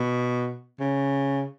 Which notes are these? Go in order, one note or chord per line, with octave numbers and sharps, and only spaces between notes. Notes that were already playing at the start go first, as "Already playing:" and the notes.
Already playing: B2
C#3